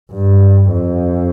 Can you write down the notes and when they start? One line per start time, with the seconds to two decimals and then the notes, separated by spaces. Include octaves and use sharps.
0.12 G2
0.73 F2